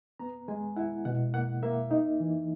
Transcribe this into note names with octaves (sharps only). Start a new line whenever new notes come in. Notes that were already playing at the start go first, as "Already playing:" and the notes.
B3 A#5
G#3 G#5
E4 F#5
B2 F#5
A#3 F#5
A#3 E5
D#4
E3